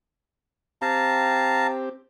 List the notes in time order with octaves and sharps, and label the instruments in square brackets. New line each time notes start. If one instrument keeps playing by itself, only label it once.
[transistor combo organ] C4 G4 [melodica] F5 A5 A#5